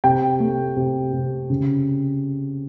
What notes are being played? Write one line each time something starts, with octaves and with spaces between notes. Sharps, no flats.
C3 G5
A3
C3
C3
C#3